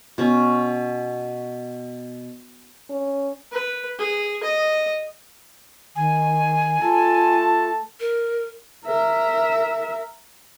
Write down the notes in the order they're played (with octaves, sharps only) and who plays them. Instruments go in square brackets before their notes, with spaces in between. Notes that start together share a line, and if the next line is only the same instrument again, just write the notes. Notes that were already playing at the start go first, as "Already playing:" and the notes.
[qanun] B2 C#4
[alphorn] C#4
[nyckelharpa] B4
G#4
D#5
[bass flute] D#3 [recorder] G#5
[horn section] A3 A4 A5 [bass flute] F4
[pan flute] A#4
[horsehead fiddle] A#4 E5